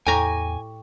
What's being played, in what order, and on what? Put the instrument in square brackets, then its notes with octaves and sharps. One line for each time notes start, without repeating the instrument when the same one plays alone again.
[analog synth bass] E2 [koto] A2 G4 A#5 [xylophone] G5 C#6 [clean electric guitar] G#5